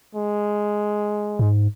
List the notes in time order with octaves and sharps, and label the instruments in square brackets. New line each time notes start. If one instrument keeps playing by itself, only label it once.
[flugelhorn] G#3
[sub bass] G#2